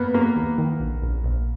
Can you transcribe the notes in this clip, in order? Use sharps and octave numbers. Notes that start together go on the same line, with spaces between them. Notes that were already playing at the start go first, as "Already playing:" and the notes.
Already playing: A#3 B3
F#3 A#3
D#2
D#3
A#1
A#1
A#1